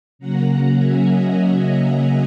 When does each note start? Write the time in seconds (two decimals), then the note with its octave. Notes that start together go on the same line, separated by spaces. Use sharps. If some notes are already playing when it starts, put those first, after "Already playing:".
0.19 C#3 F#3 A#3 C#4 F#5 A#5
0.78 E5 G#5
1.08 D#5 F#5
1.96 E5